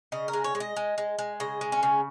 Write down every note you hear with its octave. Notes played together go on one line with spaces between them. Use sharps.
C#3 D#5
A#4
G#3
C#5
G#3
D#5
G#3
G#3
G#3
C#3 D#5
G#3
C#4
C#3